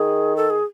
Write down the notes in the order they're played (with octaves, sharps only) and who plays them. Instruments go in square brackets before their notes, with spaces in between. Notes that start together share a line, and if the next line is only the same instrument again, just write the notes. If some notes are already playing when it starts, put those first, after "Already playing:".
Already playing: [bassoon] D#3 [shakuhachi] G#4
[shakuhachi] A4
G#4